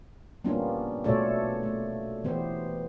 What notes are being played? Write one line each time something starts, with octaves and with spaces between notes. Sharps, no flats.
G3 A#3 B3 C#4 D4 F4
B2 A3 F4 A4 C#5 D5
A3
E3 B3 G4 C5